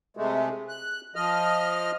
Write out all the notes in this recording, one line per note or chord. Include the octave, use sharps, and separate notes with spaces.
C3 G#3 A3
F#6
F3 D#5 F6